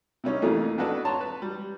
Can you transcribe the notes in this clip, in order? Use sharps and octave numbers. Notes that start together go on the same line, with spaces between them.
C3 G3 C#4 D#4
F2 E3 A3 A#3 D#4
F2 D4 F#4 A4 B4 D#5
C#5 A5 A#5 C6
B4
G3